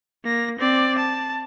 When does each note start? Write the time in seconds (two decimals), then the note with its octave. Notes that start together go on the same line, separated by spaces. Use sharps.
0.24 A#3 A#6
0.59 C4 D5
0.98 A5